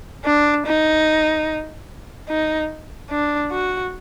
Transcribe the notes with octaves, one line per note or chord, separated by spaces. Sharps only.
D4
D#4
D#4
D4
F#4